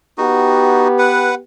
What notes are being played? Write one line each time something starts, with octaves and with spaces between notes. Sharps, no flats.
B3 D#4 F#4 G4
B4 F#5